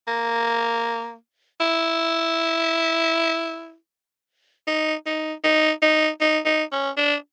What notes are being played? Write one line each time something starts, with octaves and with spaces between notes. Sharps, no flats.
A#3
E4
D#4
D#4
D#4
D#4
D#4
D#4
C#4
D4